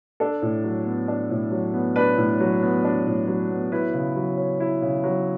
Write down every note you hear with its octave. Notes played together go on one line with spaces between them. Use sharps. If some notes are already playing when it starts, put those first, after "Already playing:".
D4 A4
A2
F#3
B3
D4
A2
F#3
B3
D4 B4
A2
F#3
B3
D4
A2
F#3
B3
E4 B4
C#3
F#3
C#4
E4
C#3
F#3